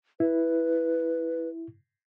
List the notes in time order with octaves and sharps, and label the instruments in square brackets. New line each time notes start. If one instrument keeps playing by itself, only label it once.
[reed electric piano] E4 [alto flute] B4